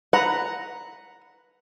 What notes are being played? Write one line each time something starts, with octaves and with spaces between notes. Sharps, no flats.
B4 F#5 A#5